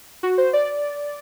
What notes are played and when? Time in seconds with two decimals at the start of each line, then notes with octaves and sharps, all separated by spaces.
0.23 F#4
0.38 C5
0.53 D5